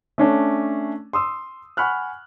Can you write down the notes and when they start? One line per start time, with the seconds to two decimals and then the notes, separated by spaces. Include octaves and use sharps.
0.18 A3 C#4 D4
1.13 C6 D#6 E6
1.77 F#5 G#5 B5 C#6 F6 F#6